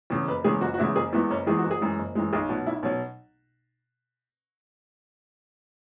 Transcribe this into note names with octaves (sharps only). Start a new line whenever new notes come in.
E2 C#3
F#1 B4
E2 C#3 G#3 G#4
F#1 F#4
F#4
E2 C#3 G#3 E4
F#1 G#4
E2 E3 G#3 B3
F#1 C#4
E2 E3 G#3 G#4
F#1 F#4
G#4
F#2 E3 G#3
F#1
F#2 E3 G#3
B1 G#4
B2 F#3 F#4
B1 E4
B2 F#3 C#4